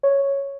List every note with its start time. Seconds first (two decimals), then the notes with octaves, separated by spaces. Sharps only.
0.03 C#5